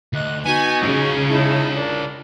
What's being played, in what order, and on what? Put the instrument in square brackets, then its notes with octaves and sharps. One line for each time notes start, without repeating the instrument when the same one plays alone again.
[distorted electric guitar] D2 [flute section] D#5 F#6
[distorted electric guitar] B3 [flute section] D#4 F#4 [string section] G#5
[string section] C#3 [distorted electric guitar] F4 C#5
[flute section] D#4 E4 A5
D4 A#4